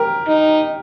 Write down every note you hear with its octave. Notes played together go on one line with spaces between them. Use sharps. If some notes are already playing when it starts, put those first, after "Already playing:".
Already playing: G4 A#4
D#4